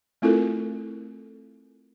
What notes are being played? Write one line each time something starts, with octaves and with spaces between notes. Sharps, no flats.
A3 C4 E4 F4 A4 A#4